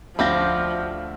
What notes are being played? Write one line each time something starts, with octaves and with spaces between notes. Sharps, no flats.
D2 F3 G3 G4 E5 F5 B5 A#6